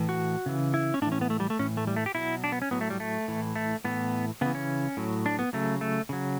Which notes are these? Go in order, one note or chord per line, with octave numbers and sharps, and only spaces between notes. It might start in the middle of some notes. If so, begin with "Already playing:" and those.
Already playing: A2 E3
F#4
C#3 E3
E4
C#4
A2 E3 C#4 D4
B3
A3
G3
A3
A2 E3 C#4
A3
G3
A3
G4
B2 F#3 E4
D4
B3
C#4
A2 F#3 B3
A3
G3
A3
A2 E3
A3
A2 E3 B3
C#3 E3 B3
C#4
A2 F#3
D4
B3
C#3 F#3 A3
A3
C#3 F#3